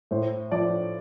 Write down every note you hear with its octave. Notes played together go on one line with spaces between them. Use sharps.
A2 C5
F3 D5